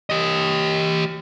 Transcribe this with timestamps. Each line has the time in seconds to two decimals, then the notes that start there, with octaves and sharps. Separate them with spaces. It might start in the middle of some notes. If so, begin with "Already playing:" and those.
0.10 G4 D#5